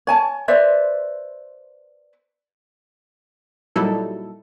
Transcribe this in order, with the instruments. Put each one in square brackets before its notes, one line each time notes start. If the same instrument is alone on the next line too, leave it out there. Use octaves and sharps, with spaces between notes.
[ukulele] C#5 G#5 A5
B4 C5 D5 E5
[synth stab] A#2 F#3 G3 D#4 E4 A4